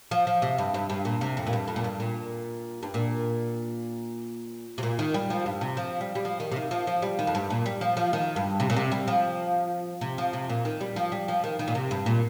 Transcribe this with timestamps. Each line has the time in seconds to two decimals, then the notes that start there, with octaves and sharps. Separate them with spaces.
0.11 F3
0.27 F3
0.42 C3
0.58 G2
0.74 G2
0.90 G2
1.05 A#2
1.21 C3
1.37 F2
1.47 A#2
1.53 G2
1.68 F2
1.76 A#2
1.84 G2
2.00 A#2
2.83 G2
2.94 A#2
4.78 C3
4.83 A#2
4.99 D#3
5.14 G3
5.30 F3
5.46 G2
5.61 C3
5.77 F3
6.01 G3
6.15 G3
6.25 F3
6.40 D#3
6.52 C3
6.56 D#3
6.71 F3
6.87 F3
7.02 G3
7.19 D#3
7.27 F2
7.35 G2
7.50 A#2
7.66 G3
7.81 F3
7.97 F3
8.13 D#3
8.36 G2
8.60 C3
8.70 A#2
8.76 C3
8.92 G3
9.08 F3
10.01 C3
10.18 F3
10.33 C3
10.49 A#2
10.65 D#3
10.81 G3
10.96 F3
11.12 G3
11.28 F3
11.44 D#3
11.59 D#3
11.68 A#2
11.75 C3
11.91 G2
12.06 A#2